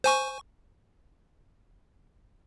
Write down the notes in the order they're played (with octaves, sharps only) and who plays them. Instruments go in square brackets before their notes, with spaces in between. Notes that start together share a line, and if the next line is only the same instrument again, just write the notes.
[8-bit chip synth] C5 G#5 C#6